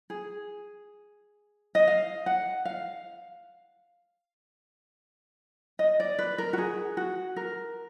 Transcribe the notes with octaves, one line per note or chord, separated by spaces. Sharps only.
G#4
D#5
F5
F#5
F5
D#5
D5
B4
A#4
F#4
G#4
F#4
A#4